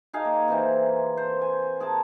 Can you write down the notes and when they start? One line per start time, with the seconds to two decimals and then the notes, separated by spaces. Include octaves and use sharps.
0.13 D#4 G#4 F5 G#5
0.25 A#3
0.48 C3 E3 C4
1.17 C5
1.41 G#5
1.80 G#4 A#4 A5